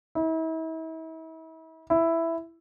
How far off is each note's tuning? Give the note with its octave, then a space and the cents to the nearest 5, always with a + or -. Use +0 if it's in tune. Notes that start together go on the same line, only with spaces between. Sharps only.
E4 -40
E4 +5